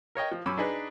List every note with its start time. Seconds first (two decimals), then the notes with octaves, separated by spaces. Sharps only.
0.15 A#4 C#5 D#5 G5
0.32 F3
0.46 F#2 C#4 B5 D6 E6
0.58 D4 D#4 G#4 B4 D5